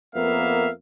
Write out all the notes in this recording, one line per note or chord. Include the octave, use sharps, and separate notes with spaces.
F2 A#3 B3 A#4 E5 F5